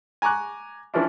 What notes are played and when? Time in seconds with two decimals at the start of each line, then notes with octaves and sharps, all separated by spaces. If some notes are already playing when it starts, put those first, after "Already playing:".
0.22 G#5 A#5 C#6 D6 F#6
0.94 E3 F3 C#4 D4 E4